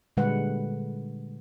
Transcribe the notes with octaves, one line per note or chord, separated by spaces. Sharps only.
A#2 D3 G3 G#3 B4 F#5